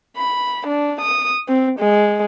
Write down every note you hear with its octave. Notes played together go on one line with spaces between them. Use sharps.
B5
D4
D#6
C4
G#3